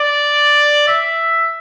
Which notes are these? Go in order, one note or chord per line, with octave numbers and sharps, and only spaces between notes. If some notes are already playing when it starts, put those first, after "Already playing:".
Already playing: D5
E5